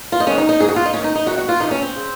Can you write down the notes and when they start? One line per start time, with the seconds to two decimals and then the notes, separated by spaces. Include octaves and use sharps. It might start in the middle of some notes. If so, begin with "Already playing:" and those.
0.12 F4
0.20 D#4
0.27 G#2 D#3 C#4
0.38 D#4
0.49 D#4
0.60 G#2 G#4
0.64 D#3 F#4
0.76 F4
0.85 D#4
0.93 G#2 D#3 C#4
1.04 D#4
1.15 D#4
1.26 F#2 D#3 F#4
1.38 F#4
1.48 F4
1.60 F2 C3 D#3 D#4
1.71 C#4
1.82 C4
1.96 C#3